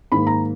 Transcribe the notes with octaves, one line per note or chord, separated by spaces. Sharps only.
G#2 D#3 A#3 B5
A#5